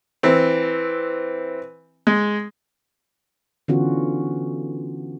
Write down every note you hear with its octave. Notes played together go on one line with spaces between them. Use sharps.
E3 C4
G#3
D3 E3 B3 C#4 F4 F#4